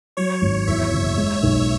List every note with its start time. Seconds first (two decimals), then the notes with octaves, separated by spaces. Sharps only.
0.17 F#3 C#5
0.42 G#1
0.67 E2 E5
0.92 F#1
1.17 G#3
1.43 B1